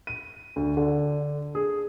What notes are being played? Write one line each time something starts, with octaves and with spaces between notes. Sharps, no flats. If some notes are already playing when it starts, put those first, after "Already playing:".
D#7
D2
D3
G#4